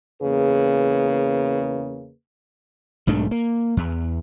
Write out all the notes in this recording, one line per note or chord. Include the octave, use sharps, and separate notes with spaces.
E2 C#3 A#3 G#4 B4
B1 G#2 A3 D4
A#3
E2